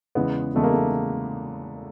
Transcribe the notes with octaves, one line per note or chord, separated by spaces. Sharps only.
E2 C#3 E3 G#3 B3
E2 C#3 E3 G#3 A3
A#3
A3